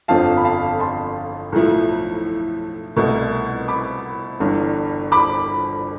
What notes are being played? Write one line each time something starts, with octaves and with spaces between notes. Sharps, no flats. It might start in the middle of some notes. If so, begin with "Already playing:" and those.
G1 F2 D3 F3 C4 F5 A5
B5
F5 A5
A5 C6
B1 A2 F3 A3
C2 B2 A3
B5 D6
G1 G2 E3
B5 D6